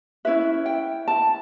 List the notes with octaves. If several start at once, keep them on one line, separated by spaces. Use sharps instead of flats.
C#4 E4 B4 E5
G5
A5